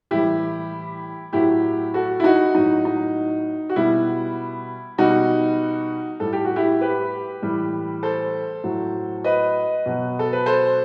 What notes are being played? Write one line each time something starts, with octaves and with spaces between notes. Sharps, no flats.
A2 E3 G3 E4 G4
A2 F#3 E4 G4
F#4 A4
E4
D#4 F#4
A2 F#3 D#4
D#4
F#4
B2 G3 E4
B2 G3 D#4 F#4
A2 G3 A4
G4
F#4
E4 G4
G4 B4
A2 E3 G3
A4 C5
A2 F#3
B4 D#5
B2 F#3
A4
B4
A4 C5